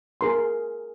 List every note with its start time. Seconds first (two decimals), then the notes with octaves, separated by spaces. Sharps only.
0.21 G#4 A#4 C6